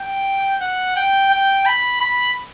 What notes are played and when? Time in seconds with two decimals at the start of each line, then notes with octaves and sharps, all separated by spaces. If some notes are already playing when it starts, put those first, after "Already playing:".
Already playing: G5
0.61 F#5
0.96 G5
1.31 G5
1.66 B5
2.01 B5